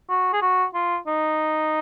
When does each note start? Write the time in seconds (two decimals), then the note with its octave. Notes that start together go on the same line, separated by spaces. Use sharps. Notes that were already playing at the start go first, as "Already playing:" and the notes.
0.09 F#4
0.33 G#4
0.42 F#4
0.74 F4
1.07 D#4